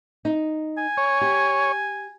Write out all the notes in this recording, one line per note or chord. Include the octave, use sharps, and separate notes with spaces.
D#4
G#5
C#5
G4